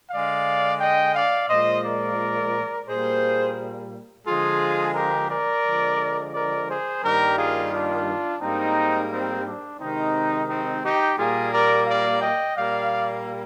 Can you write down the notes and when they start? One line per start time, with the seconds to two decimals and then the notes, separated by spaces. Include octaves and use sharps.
0.10 D3 G#3 D5 F5
0.80 D#5 G5
1.15 D5 F5
1.49 A#2 F3 G#3 C5 D#5
1.84 A#4 D5
2.87 A#2 G3 A#3 G#4 C5
4.26 D3 F3 G#3 F4 G#4
4.94 G4 A#4
5.29 A#4 D5
5.64 D3 F3 G#3
6.33 A#4 D5
6.68 G#4 C5
7.02 G2 D#3 G3 A#3 G4 A#4
7.37 F4 G#4
7.72 D4 F4
8.40 G#2 G3 A#3 C4 D#4
9.10 C4 D#4
9.45 D4
9.79 C3 D#3 G#3 C4 D#4
10.48 C4 D#4
10.82 D#4 G4
11.17 A#2 G3 A#3 F4 G#4
11.52 A#4 D5
11.86 D5 F5
12.21 D#5 G5
12.56 A#2 G3 A#3 D5 F5